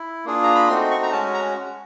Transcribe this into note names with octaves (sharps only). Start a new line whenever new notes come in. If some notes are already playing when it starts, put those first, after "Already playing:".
Already playing: E4
A#3 D4 F4 G#4
A#5
B5
A3 C4 D#4 F#4 C6
C#6
A#5
G#3 C#4 F#4 A5
A#5